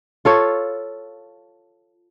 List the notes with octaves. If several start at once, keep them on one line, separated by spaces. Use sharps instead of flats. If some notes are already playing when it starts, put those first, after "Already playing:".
F4 A4 C#5